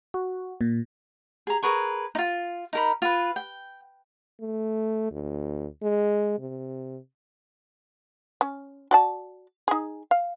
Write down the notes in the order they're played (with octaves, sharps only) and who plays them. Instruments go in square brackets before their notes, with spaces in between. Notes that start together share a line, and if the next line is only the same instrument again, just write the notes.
[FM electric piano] F#4
A#2
[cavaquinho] G#4 A#5
G#4 A#4 B4 C#6
D#4 F4
D#4 A#4 B5
F4 B4
G5
[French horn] A3
D2
G#3
C3
[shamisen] C#4
F#4 D5 A5
D#4 G#4
F5